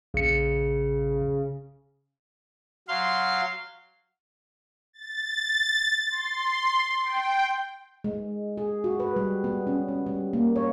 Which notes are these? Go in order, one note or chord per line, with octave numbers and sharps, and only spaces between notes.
A#1 C#3 C#7
F#3 F5 C6
A6
C6
G5
G#3
G#4
F#4
B4
G3
B3
C#4
C#4
G3
A#3
C#5